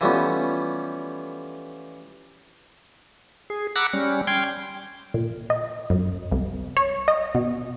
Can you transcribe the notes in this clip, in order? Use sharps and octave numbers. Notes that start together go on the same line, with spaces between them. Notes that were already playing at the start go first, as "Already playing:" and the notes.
E3 F3 G3 A3 B3 C#4
G#4
F#5 A#5 B5 D6 E6 F#6
G3 C#4
G5 C6 F6 G#6
A#2
D#5
F#2
C2
C#5
D#5
B2